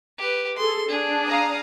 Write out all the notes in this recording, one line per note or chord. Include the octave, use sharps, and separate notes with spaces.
G4 B4
G#4 A4 C6
D4 G#4
F5 A#5 D#6